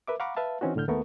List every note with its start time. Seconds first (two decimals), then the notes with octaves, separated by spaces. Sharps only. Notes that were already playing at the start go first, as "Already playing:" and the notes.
0.07 A#4 B4 E5 D6
0.20 F5 F#5 A#5 B5 C#6 D6
0.37 B4 E5 F5 A5
0.61 E3 C4 C#4 D#4 F#4
0.75 C2 A2 D3 F6 G6
0.88 D#2 A3 B3 A#4 C#6